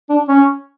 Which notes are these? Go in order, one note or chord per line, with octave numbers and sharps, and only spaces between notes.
D4
C#4